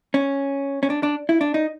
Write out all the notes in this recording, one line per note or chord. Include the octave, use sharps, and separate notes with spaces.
C#4
C#4
D4
D4
E4
D4
D#4